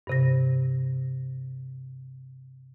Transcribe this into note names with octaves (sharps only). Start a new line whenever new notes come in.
G2 C3 A#6